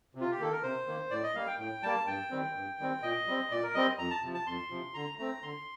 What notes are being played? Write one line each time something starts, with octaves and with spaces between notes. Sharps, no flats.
C3
F4
G4
D#3 A#3 A4
A#4
C3 C5
D#3 A#3
A2 D5
D#5
G3 A#3 F5
G5
A2 G5
G3 A#3 A5
G2 G5
D#3 G3 C4
G2
D#3 G3 C4
A#2 D#5
G3 C4
A#2 D5
A#4
G3 C4 D#5
F2 A#5
A5
C3 F3
A5
F2 C6
C3 F3
D3 A#5
A3 C4 A#5
D3 C6